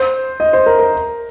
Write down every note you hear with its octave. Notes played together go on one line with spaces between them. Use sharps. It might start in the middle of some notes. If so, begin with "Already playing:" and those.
Already playing: C5
D#5
C5
A#4
A#4